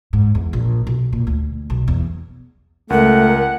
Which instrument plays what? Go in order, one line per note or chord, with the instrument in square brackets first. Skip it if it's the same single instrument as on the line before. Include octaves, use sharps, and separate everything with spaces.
[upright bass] G#2
E2
A#1
B1
A#2
D2
B1
E2
[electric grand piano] C#2 [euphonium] A3 [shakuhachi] A#4 [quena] F#5